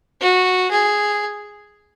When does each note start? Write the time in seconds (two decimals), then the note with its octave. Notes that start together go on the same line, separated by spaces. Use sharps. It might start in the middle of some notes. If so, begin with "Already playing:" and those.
0.21 F#4
0.71 G#4